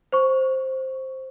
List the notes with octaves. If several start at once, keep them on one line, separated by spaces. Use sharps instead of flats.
C5 C#6